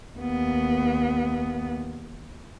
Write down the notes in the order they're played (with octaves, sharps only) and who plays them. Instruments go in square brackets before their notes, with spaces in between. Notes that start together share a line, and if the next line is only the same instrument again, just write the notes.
[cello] D#2 B3